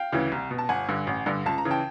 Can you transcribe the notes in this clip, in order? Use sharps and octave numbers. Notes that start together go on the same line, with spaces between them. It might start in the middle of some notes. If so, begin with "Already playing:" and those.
Already playing: F5 G5
D2 C#3 E3
C2
B2
A5
G1 F#5 G#5
G2 D3
A1
G2 D3
C#2 A5
A#5
C#3 E3
G5 A5